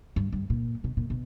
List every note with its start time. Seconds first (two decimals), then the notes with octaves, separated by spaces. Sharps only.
0.16 G2
0.32 G2
0.50 A#2
0.84 B2
0.97 A#2
1.10 B2